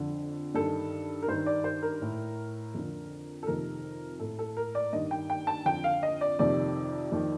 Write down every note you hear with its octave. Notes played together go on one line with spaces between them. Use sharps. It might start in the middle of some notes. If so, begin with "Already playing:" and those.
Already playing: F2 D3
G2 D#3 A4
A#4
G2 D#3 C5
D5
C5
A#4
A2
F2 D3
A4
F2 C3 D#3 A#4
A2 A4
A4
A#4
D5
G2 D#3 D#5
G5
G5
A5
F2 D3 G5
F5
D#5
D5
F2 C3 D#3 D5
F2 D#3